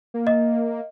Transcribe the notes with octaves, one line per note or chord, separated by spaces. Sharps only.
A#3
D#5